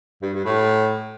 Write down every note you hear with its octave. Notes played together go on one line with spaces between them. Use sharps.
G2
G2
A2